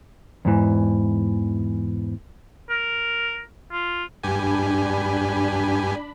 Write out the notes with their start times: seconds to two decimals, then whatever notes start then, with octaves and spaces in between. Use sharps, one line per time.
0.45 E2 G#2 E3
2.70 A#4
3.72 F4
4.23 G2 D4 G4 G#5 B5